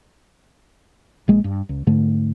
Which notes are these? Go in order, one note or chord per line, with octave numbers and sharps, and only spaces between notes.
A#1 G#3 A#3
G2
C#2
G#2 D3 A3